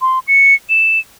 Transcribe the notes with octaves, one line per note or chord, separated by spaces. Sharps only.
C6
C#7
E7